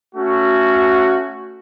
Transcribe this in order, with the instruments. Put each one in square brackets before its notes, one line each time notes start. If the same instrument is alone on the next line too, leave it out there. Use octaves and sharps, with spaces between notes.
[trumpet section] A3 C#4 F#4